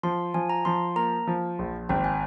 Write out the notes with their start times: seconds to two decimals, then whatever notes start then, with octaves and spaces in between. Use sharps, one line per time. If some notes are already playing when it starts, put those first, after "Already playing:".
0.03 F3 C6
0.34 F3 G#5
0.49 A#5
0.65 F3 C6
0.96 A#3 A#5
1.27 F3
1.59 A#1
1.89 G#1 G5
2.04 G#5